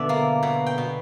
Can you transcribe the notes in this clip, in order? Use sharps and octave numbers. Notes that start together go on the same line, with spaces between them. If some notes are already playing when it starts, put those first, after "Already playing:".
Already playing: B2 D3 D5 E5
A#3
B2
G5
B2